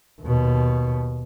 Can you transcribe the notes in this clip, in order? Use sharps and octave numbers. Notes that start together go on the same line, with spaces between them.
D#2 B2